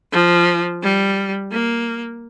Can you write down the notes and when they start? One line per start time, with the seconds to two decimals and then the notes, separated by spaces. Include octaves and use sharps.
0.13 F3
0.82 G3
1.52 A#3